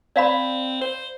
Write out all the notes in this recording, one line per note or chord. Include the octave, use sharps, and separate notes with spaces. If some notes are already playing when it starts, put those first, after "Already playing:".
C4 D5 F5 B5
C5